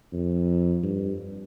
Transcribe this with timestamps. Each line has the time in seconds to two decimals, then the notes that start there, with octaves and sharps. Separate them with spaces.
0.13 F2
0.83 G2